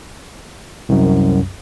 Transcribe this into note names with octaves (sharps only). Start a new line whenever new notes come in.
C2 F#2